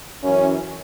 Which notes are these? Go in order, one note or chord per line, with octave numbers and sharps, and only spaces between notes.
F#2 E3 C#4